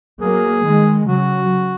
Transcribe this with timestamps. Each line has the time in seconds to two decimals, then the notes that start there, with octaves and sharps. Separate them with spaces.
0.20 F#3 A#3 G#4
0.65 D#3 G#3
1.07 C#3 F#3 F#4